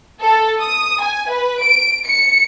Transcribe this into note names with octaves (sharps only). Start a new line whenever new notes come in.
A4
D#6
G#5
B4
D7
C#7